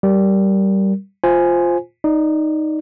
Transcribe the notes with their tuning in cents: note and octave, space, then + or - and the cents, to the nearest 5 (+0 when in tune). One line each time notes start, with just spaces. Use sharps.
G3 -15 A#4 +0
F4 +0 C5 +0 G#5 +0
D#4 +0 D5 +0